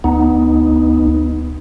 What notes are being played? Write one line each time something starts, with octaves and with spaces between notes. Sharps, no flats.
D2 B3 D#4